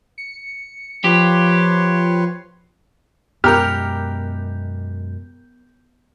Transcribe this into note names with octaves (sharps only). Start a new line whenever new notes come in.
C#7
F3 G4 B4 C#5 C6
F#2 B2 G#3 B3 G4 A#4 F6 G6